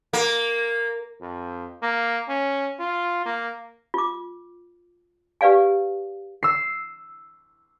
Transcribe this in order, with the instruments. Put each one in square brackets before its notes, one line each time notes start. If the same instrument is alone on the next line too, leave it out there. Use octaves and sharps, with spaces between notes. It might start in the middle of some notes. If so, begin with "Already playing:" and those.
[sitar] A#3
[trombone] F2
A#3
C#4
F4
A#3
[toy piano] F4 D6
G4 B4 D5 F5 G#5
[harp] E6 C7